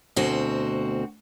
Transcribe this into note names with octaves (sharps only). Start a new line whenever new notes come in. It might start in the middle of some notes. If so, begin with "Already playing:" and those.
D2 B2 C4 F#4